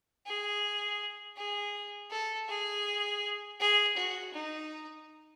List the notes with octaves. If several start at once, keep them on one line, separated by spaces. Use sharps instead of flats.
G#4
G#4
A4
G#4
G#4
F#4
D#4